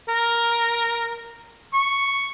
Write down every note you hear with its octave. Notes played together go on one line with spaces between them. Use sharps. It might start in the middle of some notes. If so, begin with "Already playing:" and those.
A#4
C#6